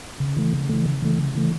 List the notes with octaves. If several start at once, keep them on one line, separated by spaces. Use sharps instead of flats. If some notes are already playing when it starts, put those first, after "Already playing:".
C#3
E3 A3
C#3
E3 A3
C#3
E3 A3
C#3
E3 A3